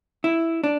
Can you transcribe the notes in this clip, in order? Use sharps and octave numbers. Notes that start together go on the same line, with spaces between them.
E4
D4